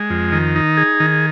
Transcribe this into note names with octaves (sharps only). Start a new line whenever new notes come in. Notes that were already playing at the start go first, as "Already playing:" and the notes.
Already playing: G#3
F2
D#3
D#4
G#4
D#3